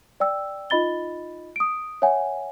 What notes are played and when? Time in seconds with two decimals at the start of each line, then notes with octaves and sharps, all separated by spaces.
0.20 D5 G5 E6
0.70 D#4 F4 D#5 B5 A6 G7
1.56 D#6 D7
2.02 C#5 E5 F#5 G#5